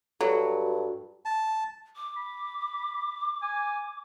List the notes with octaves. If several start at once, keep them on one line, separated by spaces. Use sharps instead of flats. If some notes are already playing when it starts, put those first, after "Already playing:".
G2 F#3 F#4 A4
A5
D6
B5
G#5